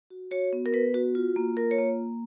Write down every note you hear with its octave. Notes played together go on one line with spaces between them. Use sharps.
F#4
F#4 C#5
B3
A#4
B3 B4
F#4
F4
A#3
F4 A#4
C#5
A#3